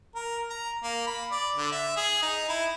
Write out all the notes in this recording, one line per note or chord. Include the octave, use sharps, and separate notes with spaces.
A#4
A#5
A#3
B5
D5
D3
E5
G#4
D#4
E4